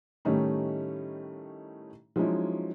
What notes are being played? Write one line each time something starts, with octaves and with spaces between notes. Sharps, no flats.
A2 D#3 G3 A3 C#4 D#4
F3 F#3 G#3 C#4 D#4 E4